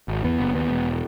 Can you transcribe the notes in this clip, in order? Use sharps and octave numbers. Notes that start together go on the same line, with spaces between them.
G#1
E2 B3
F#1
D#2 B3
E1